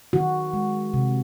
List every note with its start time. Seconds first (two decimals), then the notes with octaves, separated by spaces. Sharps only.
0.13 D#3 F#4
0.53 G#3
0.94 C3